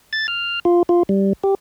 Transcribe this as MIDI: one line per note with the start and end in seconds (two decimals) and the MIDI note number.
0.13 0.27 93
0.28 0.60 89
0.65 0.83 65
0.89 1.03 65
1.09 1.33 55
1.44 1.55 67